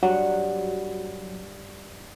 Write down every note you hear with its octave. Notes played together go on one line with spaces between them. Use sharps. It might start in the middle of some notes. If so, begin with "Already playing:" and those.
G2 F#3 F#5